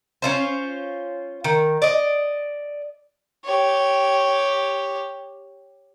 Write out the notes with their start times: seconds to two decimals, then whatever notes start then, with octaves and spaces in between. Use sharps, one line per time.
0.22 C#4 F4 C5
1.44 D#3
1.82 D5 D#5
3.45 G4 C#5